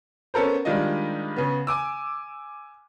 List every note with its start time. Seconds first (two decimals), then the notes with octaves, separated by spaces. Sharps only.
0.34 B3 C#4 A4 A#4 C5
0.65 D#3 G3 G#3 D4 F4 D#5
1.36 C#3 B3
1.67 G#5 D6 E6